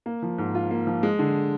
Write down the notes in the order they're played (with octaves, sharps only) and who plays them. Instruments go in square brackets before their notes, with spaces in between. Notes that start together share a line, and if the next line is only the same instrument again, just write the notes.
[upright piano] A#3
F3
G#2
F4
A#3
F3
G#3
D3